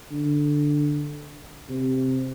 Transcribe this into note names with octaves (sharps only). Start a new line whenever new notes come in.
D3
C3